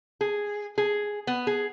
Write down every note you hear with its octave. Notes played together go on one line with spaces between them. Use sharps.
G#4
G#4
B3
G#4